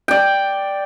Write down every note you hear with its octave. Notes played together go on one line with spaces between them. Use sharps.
D5 G5